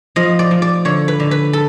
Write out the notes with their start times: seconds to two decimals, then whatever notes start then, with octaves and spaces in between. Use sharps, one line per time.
0.16 F3 D#5
0.39 D5
0.51 F3
0.62 D5
0.85 D3 C#5
1.08 B4
1.20 D3
1.31 B4
1.53 A4